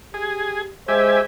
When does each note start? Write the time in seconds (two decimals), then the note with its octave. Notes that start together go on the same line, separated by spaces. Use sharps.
0.14 G4 G#4
0.88 G#3 G4 C5 E5 G#5